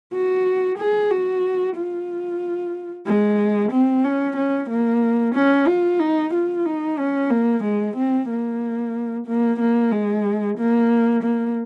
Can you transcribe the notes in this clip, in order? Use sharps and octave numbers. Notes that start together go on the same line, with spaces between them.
F#4
G#4
F#4
F4
G#3
C4
C#4
C#4
A#3
C#4
F4
D#4
F4
D#4
C#4
A#3
G#3
C4
A#3
A#3
A#3
G#3
A#3
A#3